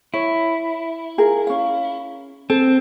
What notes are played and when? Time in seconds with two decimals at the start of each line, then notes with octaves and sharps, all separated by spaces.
0.14 E4 C#5
1.18 F4 G#4 A#4
1.47 C#4 F5
2.50 C4 A4